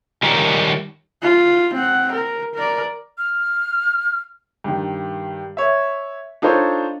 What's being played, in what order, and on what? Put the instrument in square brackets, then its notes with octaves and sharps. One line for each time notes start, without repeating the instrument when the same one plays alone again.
[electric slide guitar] D#3 G3 G4 A#4 C#5 D5
[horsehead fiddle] F4
C4 F#5
A#4
A#4 D5
[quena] F6
[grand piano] G2 D#3
C#5 E5
D4 D#4 F4 A4 C5 C#5